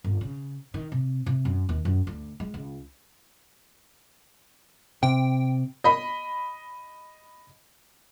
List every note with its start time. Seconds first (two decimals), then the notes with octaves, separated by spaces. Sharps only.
0.04 G1
0.21 C#3
0.74 D#3
0.92 C3
1.26 C3
1.45 F#2
1.69 D#2
1.85 F#2
2.07 D2
2.40 G#3
2.54 C#2
5.03 C3 G5
5.84 D#5 B5